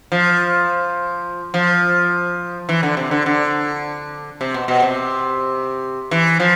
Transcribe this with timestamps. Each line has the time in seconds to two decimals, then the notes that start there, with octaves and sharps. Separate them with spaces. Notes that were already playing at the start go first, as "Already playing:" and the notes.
0.12 F3
1.54 F3
2.69 E3
2.83 D3
2.97 C3
3.11 D3
3.26 D3
4.41 C3
4.54 B2
4.68 B2
4.82 C3
6.11 E3
6.40 F3